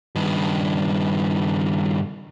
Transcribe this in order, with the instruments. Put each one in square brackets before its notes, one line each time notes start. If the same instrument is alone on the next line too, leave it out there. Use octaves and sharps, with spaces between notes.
[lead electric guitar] G2 D#3